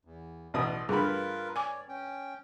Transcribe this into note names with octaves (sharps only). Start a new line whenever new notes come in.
E2
A1 B2 D5 C6 D#6
G2 A3 F4 G#4 A#4 B4 B5
C#5 D5 G#5 D6
C#4 G5